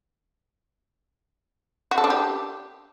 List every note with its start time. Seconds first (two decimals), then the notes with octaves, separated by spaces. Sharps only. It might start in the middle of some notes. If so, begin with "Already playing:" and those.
1.91 F#4
1.98 A4
2.04 D4
2.10 G4